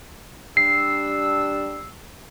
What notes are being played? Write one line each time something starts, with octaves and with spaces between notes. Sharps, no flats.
G3 D4 E6 C7